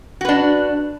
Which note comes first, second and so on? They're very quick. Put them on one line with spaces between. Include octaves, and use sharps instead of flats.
F#4 B4 D4